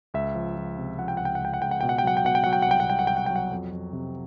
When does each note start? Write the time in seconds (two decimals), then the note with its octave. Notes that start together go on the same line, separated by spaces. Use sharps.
0.14 C#2 E5
0.35 F3
0.57 F3
0.78 C3
0.99 F3 F#5
1.08 G5
1.17 C#2 F#5
1.25 G5
1.35 F#5
1.40 C#2 G5
1.54 F#5
1.62 C#2 G5
1.71 F#5
1.81 B2 G5
1.89 F#5
1.98 G5
2.04 F#3 F#5
2.17 G5
2.25 B2 F#5
2.35 G5
2.44 F#3 F#5
2.53 G5
2.62 F#5
2.67 C2 G5
2.80 F#5
2.89 C2 G5
2.99 F#5
3.07 C2 G5
3.17 F#5
3.26 F#3 G5
3.36 F#5
3.51 F2
3.72 F2
3.93 C3